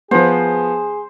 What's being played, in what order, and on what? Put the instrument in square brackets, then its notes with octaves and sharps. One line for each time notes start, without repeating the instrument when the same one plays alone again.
[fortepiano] F3 B3 [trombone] G#4 [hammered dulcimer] C5